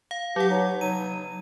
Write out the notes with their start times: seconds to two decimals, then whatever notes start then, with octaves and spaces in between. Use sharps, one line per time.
0.11 F5
0.36 F#3 G4 F#5
0.50 D#4 C#5
0.81 F#3 D#4 D#7